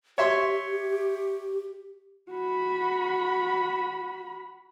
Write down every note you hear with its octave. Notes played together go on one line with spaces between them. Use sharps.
G4 C#5 E5 C6
F#4 B5